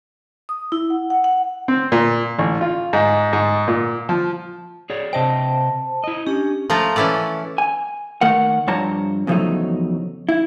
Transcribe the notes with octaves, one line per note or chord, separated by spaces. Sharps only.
D#6
E4
F#5
F#5
F#5
C4
A#2
A1
F4
G#2
G#2
A#2
F3
G#4 C#5 D5
C3 C5 D#5 G5 A5
E4 D#5
C#4 D4 G4
F3 A3 F4 A#5
E3 C#4 E4 A4 D5
G#5
D#3 A3 A#4 F#5
G2 F3 C#5 A5 A#5
E2 C#3 F3 F#3 A3 D#4
E4